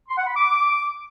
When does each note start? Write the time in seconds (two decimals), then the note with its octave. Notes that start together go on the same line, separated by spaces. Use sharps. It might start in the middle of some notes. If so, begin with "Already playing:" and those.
0.08 C6
0.17 F#5
0.27 B5
0.36 D6